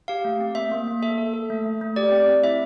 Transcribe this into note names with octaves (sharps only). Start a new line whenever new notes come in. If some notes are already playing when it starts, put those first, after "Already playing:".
G4 F5
A3
C4
A#3 E5
A#3
A#3
A4 E5
A4
A4
A3
A3
A3
G4 D5
C4
C4
E4 E5